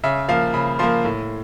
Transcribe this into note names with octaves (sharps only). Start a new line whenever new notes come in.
C#3 E5
F3 A#3 F5
C#3 B5
F3 A#3 C6
A2